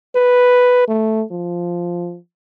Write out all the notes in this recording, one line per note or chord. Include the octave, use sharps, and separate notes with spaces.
B4
A3
F3